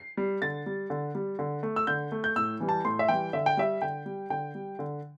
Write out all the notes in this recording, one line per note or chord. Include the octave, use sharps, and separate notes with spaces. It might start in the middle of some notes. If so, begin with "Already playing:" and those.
Already playing: C7
G3
D3 A6
G3
D3
G3
D3
A3
E6
D3 G6
A3
G6
A2 E6
E3 G3
A5
A2 C6
E5
E3 G3 G5
D3 E5
G5
G3 E5
D3 G5
G3
D3 G5
G3
D3